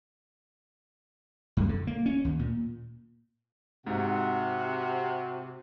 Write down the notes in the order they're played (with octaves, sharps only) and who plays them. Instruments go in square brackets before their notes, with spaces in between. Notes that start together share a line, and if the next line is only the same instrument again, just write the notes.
[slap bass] F#2
D3
A#3
C#4
D#2
A#2
[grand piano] G#2 [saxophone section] C3 [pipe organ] F#4 [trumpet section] F#5